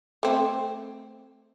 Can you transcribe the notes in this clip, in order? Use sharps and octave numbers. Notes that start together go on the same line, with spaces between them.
A3 C4